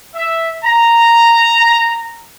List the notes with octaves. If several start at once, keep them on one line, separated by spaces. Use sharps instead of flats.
E5
A#5